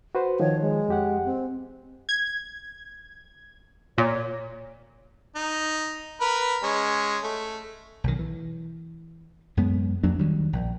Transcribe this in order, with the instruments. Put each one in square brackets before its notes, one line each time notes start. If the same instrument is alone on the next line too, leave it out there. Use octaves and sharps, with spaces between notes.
[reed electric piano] F#4 B4 C5
[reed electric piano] D#3 F3 [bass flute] C#5
[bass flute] G#3
[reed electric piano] F2 G4 F#5
[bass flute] C4
[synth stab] G#6
[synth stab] A#2 [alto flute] C#5
[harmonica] D#4
A#4 B4 B5
G#3 C#4
A3
[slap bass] B1 D#3
E3
F#2 G#3 B3
F2 F#3 A#3 D4
D2 D#3 F#3 G3
A#1